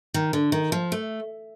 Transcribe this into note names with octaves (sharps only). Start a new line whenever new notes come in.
D#3
D3
D#3
F3
A3